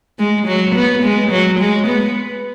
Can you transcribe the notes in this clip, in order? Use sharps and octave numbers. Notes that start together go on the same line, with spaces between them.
G#3
F#3
B3
G#3
F#3
G#3
B3